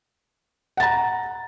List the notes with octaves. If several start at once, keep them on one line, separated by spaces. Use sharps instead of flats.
F#5 A#5 A6